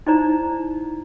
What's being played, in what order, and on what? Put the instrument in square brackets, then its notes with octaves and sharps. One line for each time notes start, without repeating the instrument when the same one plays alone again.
[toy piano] D#4 E4 C5 D5 A#5